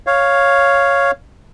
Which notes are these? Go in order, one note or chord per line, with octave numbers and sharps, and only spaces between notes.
C#5 F5